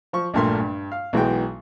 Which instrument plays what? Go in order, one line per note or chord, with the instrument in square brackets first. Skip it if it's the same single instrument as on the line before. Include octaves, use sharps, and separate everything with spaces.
[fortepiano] F3 C#6
A#1 G2 A#2 A3 A#4 C6
G2
F5
B1 E3 G#3 B3 F#4 G5